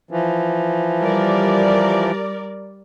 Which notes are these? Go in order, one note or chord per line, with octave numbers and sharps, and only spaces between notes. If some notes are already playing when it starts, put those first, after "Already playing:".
E3 F3
G3 A#4 D5